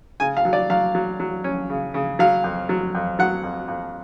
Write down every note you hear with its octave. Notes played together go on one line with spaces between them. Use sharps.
C#3 G#5
F5
F#3
D5
F#3 F5
F#3
F#3
C#4
C#3
C#3
F#3 F5
F2
F#3
F2
F#3 F#5
F2
F2